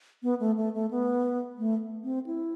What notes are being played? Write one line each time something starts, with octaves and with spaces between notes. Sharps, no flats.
B3
A3
A3
A3
B3
A3
C4
E4